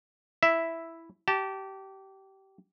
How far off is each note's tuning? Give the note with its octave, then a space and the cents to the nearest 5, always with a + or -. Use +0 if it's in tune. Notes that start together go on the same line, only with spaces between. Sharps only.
E4 +0 E5 +0
G4 -25 A5 +0